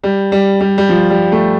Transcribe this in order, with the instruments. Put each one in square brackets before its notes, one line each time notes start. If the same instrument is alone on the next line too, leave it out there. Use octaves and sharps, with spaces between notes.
[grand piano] G3
G3
G3
G3
F3
G3
A3